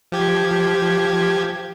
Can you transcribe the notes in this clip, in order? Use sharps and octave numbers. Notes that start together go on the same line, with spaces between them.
F3 G4 G#6